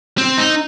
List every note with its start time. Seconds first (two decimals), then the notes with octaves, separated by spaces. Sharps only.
0.18 C4
0.38 D#4